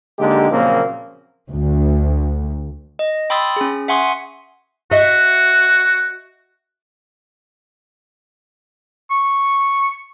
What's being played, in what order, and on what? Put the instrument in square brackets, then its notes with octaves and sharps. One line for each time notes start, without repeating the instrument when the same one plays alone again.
[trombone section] D3 G#3 A#3 D#4 G4
A#2 C#3 F3 F#3 A#3 C4
[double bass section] D2
[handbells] D#5
G5 B5 C6 D#6 E6 A6
C#4 G#4
E5 F#5 G#5 C6 C#6 D#6
[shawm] F#4 [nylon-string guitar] D#5 E5
[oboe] C#6